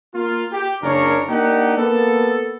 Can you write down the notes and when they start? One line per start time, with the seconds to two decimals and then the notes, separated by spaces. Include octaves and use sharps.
0.15 A#3 F4
0.53 G4
0.82 F#1 C#3 D4 A#4 C#5
1.30 A#3 D4 D#4 G4 F#5
1.78 A#3 B3 A4